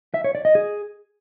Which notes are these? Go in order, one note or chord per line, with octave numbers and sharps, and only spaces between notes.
E5
C#5
D5
D#5
G#4